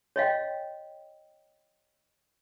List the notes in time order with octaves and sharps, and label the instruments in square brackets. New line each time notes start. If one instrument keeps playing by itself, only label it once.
[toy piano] C#5 D#5 F5 G5